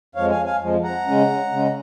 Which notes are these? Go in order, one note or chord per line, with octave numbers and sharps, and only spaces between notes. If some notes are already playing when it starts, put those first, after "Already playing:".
F2 F3 G#3 C#5 F5
F5 G#5
F5 G#5
F2 F3 G#3
F#5 A#5
C#3 G#3 C#4
C#3 G#3 C#4